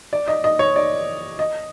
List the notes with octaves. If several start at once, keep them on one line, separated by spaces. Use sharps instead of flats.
D5
D#5
D#5
C#5
D5
D#5